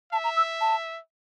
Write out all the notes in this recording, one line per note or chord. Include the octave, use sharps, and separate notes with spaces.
E5 A5
A#5
E6
A5